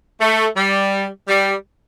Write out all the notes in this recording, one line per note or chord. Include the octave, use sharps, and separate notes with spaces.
A3
G3
G3